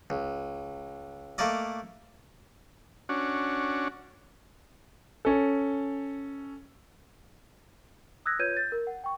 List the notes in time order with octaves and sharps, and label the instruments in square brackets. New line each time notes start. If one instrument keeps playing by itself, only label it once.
[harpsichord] C#2
A3 A#3 A#4 D5 D#5
[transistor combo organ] C#4 D4 F#4
[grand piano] C#4 A4
[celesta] D#6 E6 F#6 G#6 A#6
F4 B4 C#5 G6 G#6 D#7
G6 A6
A#4
F#5
G5 C#6